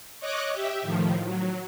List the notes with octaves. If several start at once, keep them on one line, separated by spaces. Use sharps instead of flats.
C#5 D#5 D6 F#6
G4 E5
A2 D#3 F3
F#3